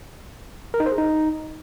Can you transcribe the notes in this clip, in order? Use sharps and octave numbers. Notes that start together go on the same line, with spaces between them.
A#4
D#4
C5
G#4
D#4